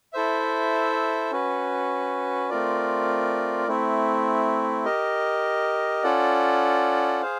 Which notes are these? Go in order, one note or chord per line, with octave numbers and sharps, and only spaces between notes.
E4 A4 C5 E5
C#4 F#4 B4
A3 C4 F4 A#4 D5
A3 C4 E4
G4 A#4 D#5
C#4 F4 A4 D5 F#5
G#4 C5 F5